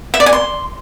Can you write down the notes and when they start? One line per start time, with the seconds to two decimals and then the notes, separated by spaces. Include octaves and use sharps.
0.14 E5
0.20 D5
0.26 G#5
0.33 C6